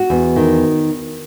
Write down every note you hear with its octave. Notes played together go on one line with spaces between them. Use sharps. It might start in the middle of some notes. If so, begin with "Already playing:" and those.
Already playing: F#4
E2
D#3